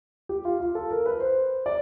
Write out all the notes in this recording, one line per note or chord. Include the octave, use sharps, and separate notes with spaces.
G4
F4
F4
A4
A#4
B4
C5
D5